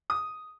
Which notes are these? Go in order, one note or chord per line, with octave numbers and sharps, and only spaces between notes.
D#6